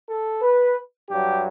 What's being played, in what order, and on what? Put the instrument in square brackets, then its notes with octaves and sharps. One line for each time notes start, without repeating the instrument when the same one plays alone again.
[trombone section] A4
B4
G2 F#3 G4